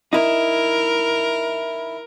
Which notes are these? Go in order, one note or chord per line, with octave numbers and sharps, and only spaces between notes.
D#4 E4 A#4